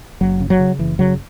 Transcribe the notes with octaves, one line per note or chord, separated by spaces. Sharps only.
F#1 F#3
C#3
F#3
C#3
F#1 E3
C#3 F#3